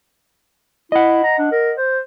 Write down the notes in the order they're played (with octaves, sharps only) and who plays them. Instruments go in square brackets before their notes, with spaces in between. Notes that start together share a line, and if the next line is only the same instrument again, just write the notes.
[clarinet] E4 [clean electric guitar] D#5 F#5
[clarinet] A#5
D4
A#4
C5